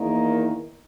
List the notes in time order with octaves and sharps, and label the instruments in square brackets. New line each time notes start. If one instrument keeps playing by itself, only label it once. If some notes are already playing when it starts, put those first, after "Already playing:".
Already playing: [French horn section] E2 D#3 A#3